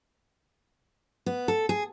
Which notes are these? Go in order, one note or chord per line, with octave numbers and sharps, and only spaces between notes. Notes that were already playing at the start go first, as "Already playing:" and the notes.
B3
A4
G#4